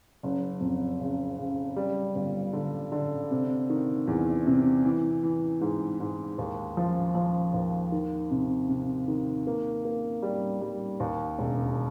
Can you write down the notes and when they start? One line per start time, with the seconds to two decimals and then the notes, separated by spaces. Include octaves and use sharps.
0.23 F#1
0.61 F2
1.00 C#3
1.39 C#3
1.76 G3
2.15 G1
2.53 D3
2.92 D3
3.31 C3
3.70 D#3
4.08 E2
4.46 C3
4.85 E3
5.23 E3
5.61 G#2
6.00 G#2
6.38 D#2
6.77 F3
7.15 F3
7.54 D#2
7.92 D#3
8.31 C3
8.69 C3
9.08 D#3
9.47 A#3
9.85 A#3
10.23 G3
10.62 G3
11.00 D#2
11.39 E1